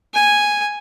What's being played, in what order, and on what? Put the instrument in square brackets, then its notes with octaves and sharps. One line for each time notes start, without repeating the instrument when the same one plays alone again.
[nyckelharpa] G#5